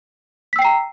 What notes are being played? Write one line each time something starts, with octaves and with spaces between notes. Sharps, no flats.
G5 A#5 E6 B6 C7